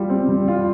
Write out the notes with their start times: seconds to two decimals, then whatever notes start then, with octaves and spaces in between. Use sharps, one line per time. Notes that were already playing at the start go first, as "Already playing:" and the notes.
Already playing: G3 F4
0.09 C4
0.29 G3
0.48 F4